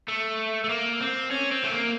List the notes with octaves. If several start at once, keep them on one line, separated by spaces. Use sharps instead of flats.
A3
A3
A#3
C4
C#4
C4
A3
A#3